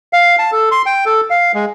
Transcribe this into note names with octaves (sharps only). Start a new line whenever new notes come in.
F5
A5
A4
C6
G5
A4
F5
G#3